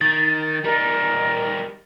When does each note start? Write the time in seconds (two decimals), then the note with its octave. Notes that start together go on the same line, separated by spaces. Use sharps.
0.01 D#3 A6
0.64 G3 D#4 A#4